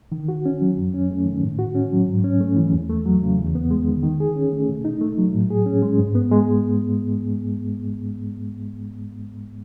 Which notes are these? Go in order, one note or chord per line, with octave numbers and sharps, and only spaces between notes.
D#3
F#4
C#4
F#3
F#2
C#4
A3
D#3
A2
F#4
C#4
F#3
G#2
C#4
A3
E3
E2
A3
F#3
C#3
E2
B3
G#3
D#3
D#3
G#4
C#4
A3
B2
D#4
A3
F#3
A2
G#4
C#4
G#3
G#2
B3
G#3